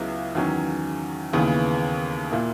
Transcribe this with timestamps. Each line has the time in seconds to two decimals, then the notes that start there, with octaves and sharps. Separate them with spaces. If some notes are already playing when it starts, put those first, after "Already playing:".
Already playing: C#2 C#3 F#3 B3 E4
0.35 E2 D#3 F#3 C#4
1.33 D#2 C#3 E3 B3
2.32 A#2 A#3 E4